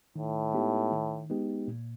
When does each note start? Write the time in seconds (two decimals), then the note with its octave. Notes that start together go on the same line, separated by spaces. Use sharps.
0.16 A2 D#3
0.54 G#3 B3 D#4 G4
0.92 D#3
1.30 G#3 B3 D#4 G4
1.68 A#2